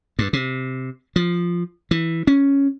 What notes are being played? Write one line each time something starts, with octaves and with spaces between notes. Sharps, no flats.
G2
C3
F3
E3
C#4